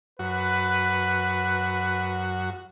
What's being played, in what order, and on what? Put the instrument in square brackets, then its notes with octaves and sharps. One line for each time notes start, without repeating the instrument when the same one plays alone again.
[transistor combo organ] F#2 F#4 [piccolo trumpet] B4